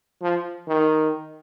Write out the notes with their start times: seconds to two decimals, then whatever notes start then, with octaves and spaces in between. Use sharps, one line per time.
0.22 F3
0.68 D#3